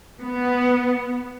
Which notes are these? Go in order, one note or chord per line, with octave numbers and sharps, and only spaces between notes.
B3